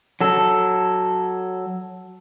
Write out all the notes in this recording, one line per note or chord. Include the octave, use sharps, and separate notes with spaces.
F#3 A4